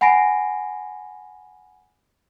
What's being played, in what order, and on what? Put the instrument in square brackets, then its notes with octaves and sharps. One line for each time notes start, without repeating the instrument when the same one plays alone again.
[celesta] F#5 G#5 B5 A#6 C7 D7